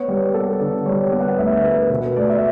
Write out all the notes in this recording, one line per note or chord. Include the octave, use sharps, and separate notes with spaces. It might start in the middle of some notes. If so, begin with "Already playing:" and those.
Already playing: B3 C#5
G3
B3 A4
D3
G3 C#5
B3
F#5
D2 E5
B3 B4
B2 B4
A3 D5
E5